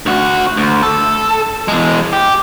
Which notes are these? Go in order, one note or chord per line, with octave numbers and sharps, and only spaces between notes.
D2 F#4
D2
A4
E2 G#3
G4